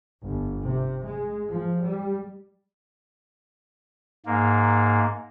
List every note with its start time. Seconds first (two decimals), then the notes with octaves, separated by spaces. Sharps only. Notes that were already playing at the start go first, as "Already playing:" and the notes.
0.22 G1
0.62 C3
1.05 G#3
1.50 F3
1.84 G3
4.26 G#2 A#3